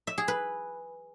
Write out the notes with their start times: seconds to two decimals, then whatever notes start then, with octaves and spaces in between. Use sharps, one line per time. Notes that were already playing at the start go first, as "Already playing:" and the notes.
0.07 E5
0.18 G#4
0.28 B4